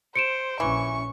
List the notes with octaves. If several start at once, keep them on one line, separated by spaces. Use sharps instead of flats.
C5 C#7 D7 E7
A#1 E3 C#4 C#6